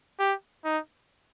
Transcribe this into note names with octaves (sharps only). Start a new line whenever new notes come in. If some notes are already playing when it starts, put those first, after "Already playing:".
G4
D#4